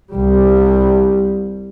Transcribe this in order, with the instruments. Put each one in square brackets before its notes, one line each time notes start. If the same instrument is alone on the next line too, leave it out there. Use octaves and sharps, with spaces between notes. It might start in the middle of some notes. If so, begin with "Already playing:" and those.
[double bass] C2 G3